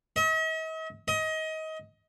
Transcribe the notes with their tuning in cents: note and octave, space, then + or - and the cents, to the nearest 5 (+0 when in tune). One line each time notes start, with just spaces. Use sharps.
D#5 +45
D#5 +25